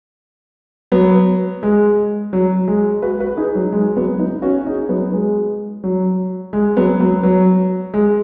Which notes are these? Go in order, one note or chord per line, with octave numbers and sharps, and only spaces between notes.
F#3 B3
G#3
F#3
G#3
F#4 B4
F#4 B4
D#4 G#4
F#3
G#3
F#3 B3
B3 D#4
C#4 F#4
D#4 G#4
F#3 B3
G#3
F#3
G#3
F#3 B3
F#3 B3
F#3
G#3